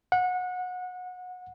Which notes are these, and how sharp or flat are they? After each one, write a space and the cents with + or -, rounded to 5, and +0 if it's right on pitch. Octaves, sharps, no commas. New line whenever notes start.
F#5 -25